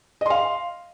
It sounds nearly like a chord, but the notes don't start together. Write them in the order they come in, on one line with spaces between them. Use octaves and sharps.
D#5 C6 F5